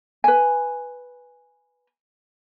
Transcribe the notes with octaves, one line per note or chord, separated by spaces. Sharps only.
B4 G#5